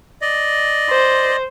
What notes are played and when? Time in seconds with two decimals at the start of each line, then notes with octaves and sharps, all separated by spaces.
0.22 D5 D#5
0.90 C5